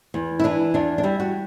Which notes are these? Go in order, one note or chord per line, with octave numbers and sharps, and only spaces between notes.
E2
E4
E3 D4
E2 D4
D4
G3 E4
F#4